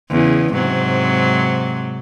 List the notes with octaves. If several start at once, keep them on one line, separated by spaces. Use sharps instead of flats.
E2 C#3
G#2 C3 F#3